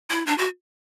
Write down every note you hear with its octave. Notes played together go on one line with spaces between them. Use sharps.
E4
D4
F#4